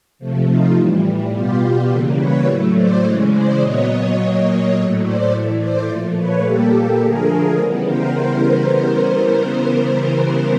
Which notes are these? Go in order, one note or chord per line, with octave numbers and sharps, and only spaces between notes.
C3 F3 A3
D#4 F4
A2 E3 G3
B2 G3 B3 F4 G4
C#3 E3 G3 A#3 A4 B4
B4 C#5
A2 F#3 A3
C5 D5
C#3 E3 G#3 C#5 D#5
C5 D5
A#2 F#3 B3 C#5 D#5
A#2 F#3 A#3 C#5 D#5
A2 F#3 A3 C#5 D#5
C5 D5
A2 E3 A3
C5 D5
A#2 F3 A3
B4 C#5
A#2 G3 A#3 G4 A4
D3 F3 A3 G#4 A#4
C#3 E3 G3 B3
A#4 C5